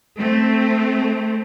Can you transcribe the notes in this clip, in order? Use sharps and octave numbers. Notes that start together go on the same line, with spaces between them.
A3 C4